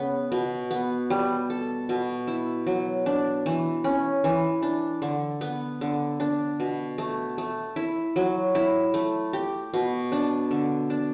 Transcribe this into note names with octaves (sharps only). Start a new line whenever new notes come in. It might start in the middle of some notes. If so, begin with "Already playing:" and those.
Already playing: C#3 B3
B2
B3
G3
A4
B2
E4
F#3
D4
E3
C#4
E3
D4
D3
B3
D3
D4
B2
A3
A3
E4
F#3
E4
A3
G4
B2
D4
D3
D4